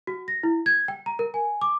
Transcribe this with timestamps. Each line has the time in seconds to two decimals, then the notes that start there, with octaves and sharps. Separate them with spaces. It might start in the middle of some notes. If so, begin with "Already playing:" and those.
0.07 F#4
0.28 A#6
0.43 E4
0.66 G#6
0.88 G5
1.06 A#5
1.19 A#4
1.34 G#5
1.61 D6